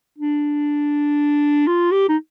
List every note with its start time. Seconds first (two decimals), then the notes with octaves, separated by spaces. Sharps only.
0.18 D4
1.67 F4
1.92 G4
2.09 D#4